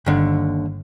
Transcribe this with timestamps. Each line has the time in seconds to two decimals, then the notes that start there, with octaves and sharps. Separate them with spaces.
0.06 G1 D#2 D3